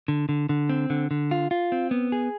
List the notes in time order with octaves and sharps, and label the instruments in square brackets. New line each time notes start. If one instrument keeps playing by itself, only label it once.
[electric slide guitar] D3
D3
D3
C4
D3
D3
F4
F4
C4
B3
G#4